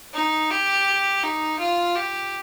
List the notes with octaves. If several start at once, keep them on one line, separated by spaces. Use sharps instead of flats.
D#4
G4
D#4
F4
G4